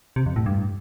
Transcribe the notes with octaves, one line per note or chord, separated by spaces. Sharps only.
C3
F2
A2
G2